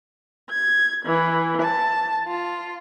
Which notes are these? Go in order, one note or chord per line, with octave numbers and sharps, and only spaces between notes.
G#6
E3
A5
F4